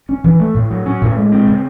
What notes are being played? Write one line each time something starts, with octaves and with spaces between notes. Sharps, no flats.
C#4
E3
A3
A2
F#3
C#4
A2
G#3
C4
C#3